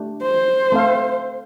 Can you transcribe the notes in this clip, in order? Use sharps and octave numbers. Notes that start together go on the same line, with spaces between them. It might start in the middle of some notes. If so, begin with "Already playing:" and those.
Already playing: A3 D4 G4
C5
A3 C4 A4 F5